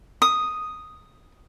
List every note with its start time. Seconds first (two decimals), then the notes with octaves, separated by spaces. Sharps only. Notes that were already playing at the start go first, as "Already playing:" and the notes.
0.22 D#6